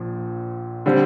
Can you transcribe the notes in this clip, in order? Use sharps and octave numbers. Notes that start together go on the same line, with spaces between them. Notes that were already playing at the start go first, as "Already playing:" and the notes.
Already playing: A#1 A#2 F3
D3 G3 C4